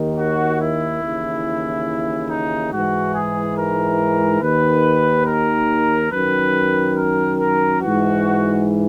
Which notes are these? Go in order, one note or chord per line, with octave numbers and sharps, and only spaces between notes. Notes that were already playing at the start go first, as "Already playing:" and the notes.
Already playing: D#2 D#3
F#4
E4
D#2 C#3 E3
D#4
G#2 E3 F#4
G#4
A#4
D#2 D#3 B4
A#4
F#2 D#3 B4
A#4
A#4
G#2 E3 F#4